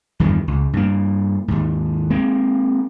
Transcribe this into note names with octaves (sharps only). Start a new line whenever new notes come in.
E2 G2 D#3 E3
C#2
G2 A#3
D#2 G#2
G#3 A#3 C4